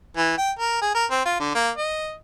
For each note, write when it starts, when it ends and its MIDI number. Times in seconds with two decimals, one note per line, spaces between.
0.17 0.34 52
0.38 0.51 79
0.59 0.81 70
0.81 0.93 68
0.95 1.05 70
1.11 1.22 60
1.25 1.36 65
1.40 1.53 50
1.55 1.70 58
1.78 2.14 75